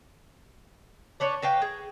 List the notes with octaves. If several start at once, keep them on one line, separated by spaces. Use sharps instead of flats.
D4 B4 C#5
F#4 B4 F5 G5
G#4